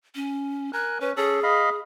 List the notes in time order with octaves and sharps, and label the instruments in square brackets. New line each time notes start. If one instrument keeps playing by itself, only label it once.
[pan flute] C#4
[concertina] A#4 G#5 [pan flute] F#6
[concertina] C#4 [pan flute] B4
[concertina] C#4 A4 [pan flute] G#4
[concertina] D#5 F5 B5